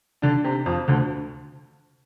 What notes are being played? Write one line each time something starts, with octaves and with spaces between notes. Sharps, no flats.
D3 D4
C3 C4
F2 F3
D2 D3